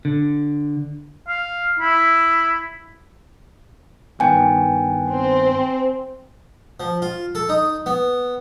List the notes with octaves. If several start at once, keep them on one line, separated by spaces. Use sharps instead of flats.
D3
F5
E4
G2 D#3 B3 G5 G#5
C4
F3
F4
A4
D#4
B3